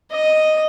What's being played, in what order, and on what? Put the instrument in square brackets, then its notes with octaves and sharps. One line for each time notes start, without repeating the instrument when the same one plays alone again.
[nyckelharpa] D#5